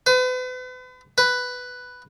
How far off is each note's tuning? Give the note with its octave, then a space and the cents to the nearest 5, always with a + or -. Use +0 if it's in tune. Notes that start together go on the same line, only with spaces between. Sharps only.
B4 +40
B4 +5